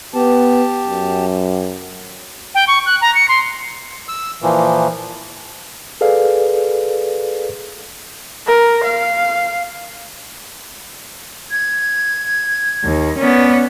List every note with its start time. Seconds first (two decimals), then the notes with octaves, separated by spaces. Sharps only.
0.14 B3 G4 A5
0.87 F#2
2.55 G5
2.67 C#6
2.86 F#6
3.01 A#5
3.15 C#7
3.28 C6
4.09 E6
4.42 A#2 E3 F3
6.01 G#4 A4 B4 D5 F5
8.47 A#4
8.85 F5
11.51 G#6
12.84 D#2
13.18 B3 C#4 D5